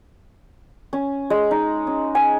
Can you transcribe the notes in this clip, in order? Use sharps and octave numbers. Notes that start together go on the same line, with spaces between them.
C#4
G#3
D#4
C#4
G#5